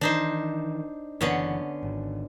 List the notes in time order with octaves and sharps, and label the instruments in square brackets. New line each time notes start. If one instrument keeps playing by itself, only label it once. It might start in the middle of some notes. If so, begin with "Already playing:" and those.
[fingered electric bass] D#3 E3 [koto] D4 D#4 C5
[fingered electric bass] F#1 E3 [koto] D3 B3 C#4
[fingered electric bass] G#1